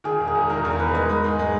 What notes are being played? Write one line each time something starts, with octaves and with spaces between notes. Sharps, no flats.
D#3 G#4
E1
G#4
E1
D#3 A#4
E2 A#4
E1 B4
G#3 D#5
G#3
G#2
G#3